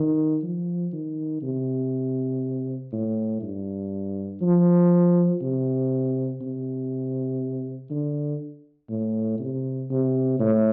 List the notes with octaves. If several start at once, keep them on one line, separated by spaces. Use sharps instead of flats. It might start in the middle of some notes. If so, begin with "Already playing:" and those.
Already playing: D#3
F3
D#3
C3
A2
G2
F3
C3
C3
D3
A2
C3
C3
A2